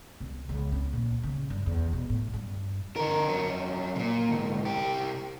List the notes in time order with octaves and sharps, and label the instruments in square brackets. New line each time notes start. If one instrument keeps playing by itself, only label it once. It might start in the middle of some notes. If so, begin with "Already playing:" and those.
[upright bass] C2
C#2
C4
A#1
C#3
G2
E2
B2
A2
G2
[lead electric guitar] D3 A#4
F2 F#3
A#2 C#3
D2 G#2
C2 G4